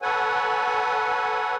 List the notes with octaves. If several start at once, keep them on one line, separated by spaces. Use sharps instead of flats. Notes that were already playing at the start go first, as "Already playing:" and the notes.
A4 B4 C#5 F#5 G#5